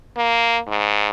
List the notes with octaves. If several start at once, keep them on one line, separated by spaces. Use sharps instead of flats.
A#3
G#2